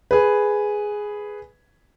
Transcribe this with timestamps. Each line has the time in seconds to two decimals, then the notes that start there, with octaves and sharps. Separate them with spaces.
0.11 G#4 B4